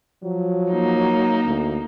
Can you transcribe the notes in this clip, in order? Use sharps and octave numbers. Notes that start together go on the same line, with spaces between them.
F3 F#3
A#3 D#4
D2